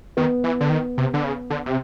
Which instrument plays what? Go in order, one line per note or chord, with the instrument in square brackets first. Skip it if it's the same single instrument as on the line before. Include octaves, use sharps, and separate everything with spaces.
[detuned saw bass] D#3 [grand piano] B3
[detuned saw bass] E3
D3
D#3
C3
D3
C#3
D3
C3